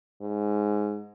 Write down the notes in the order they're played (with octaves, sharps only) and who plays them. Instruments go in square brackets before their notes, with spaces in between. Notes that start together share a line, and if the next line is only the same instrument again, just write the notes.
[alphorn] G#2